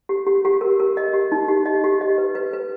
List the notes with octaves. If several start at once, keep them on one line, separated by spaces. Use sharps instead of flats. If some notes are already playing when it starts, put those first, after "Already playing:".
G4
G4
G4
A#4
A#4
D#5
G4
D#4
G4
D#5
G4
D#5
B4
B4
B4